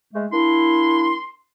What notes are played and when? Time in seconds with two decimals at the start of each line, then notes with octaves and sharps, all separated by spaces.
0.14 G#3 A3
0.33 A#3 D4 E4 C6